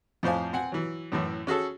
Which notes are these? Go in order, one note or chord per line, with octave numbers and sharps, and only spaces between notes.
F2 A2 C5 F5 G#5
C4 F#5 G#5
E3 F#3
F#2 A2 E3
C#4 F#4 G#4 A4